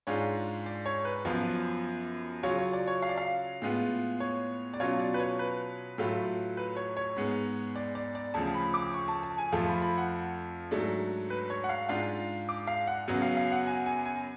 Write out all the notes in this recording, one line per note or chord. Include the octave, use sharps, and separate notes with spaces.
G#2 G#3 D4 F4 C#5
D5
C#5
B4
F#2 F3 B3 F4
C#3 F#3 C#4 F4 C#5
C#5
D5
C#5
F5
D5
F5
A2 G#3 B3 F4
C#5
D5
B2 F#3 C#4 F4 C#5
D5
B4
C#5
B4
A2 F#3 A3 F4
B4
C#5
C#5
G#2 G#3 B3
D5
D5
D5
D2 C#3 F3 A5
B5
D6
C#6
A5
A5
G#5
F2 F3 A3 F4 A5
B5
B5
F#5
G#2 F#3 A3 D4
B4
C#5
F#5
F5
G#2 G#3 D4 F4 F5
D6
F5
F#5
F#2 C#3 F#3 B3
F5
F5
F#5
G#5
G#5
G#5